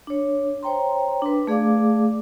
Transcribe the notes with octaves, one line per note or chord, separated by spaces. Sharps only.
D4 C#5
C5 C#5 G5 A#5 C6
D4 B4
A3 G#4 D5 F5 D6